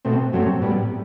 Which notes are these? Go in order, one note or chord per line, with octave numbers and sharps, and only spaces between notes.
B2 A3 C4
F#2 F#3 A3 C4
A2 G3 B3